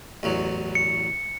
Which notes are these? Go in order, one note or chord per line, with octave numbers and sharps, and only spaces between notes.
A1 E2 F#3
C#7